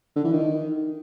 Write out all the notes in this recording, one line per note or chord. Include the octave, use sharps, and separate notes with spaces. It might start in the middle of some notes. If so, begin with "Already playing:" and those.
D3
E3
D#3